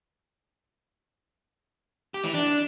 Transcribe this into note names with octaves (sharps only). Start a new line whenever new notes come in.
G4
E3
D4